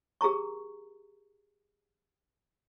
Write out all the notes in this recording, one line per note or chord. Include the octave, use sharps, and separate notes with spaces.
G4 G#4 A#4 A#5 C#6